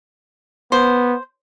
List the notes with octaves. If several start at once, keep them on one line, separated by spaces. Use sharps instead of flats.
B3 C5